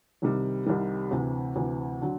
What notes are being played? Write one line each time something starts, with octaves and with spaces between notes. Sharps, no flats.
C2 C3 D#3 G3
C2 C3 D#3 G3
D2 C3 E3
D2 C3 E3
D3 F#3